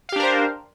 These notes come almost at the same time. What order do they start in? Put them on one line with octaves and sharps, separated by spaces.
F5 G4 D4 A#4 C5